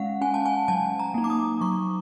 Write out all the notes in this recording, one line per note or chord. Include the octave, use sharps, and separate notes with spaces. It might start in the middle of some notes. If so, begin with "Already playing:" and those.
Already playing: G#3 C#4 F5 F#5
C#4 G#5
A5
G#5
F#3 A5
A#5
A#3 D#4
D6
D#6
F#3 C#6